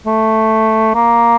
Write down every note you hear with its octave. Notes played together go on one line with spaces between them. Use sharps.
A3
A#3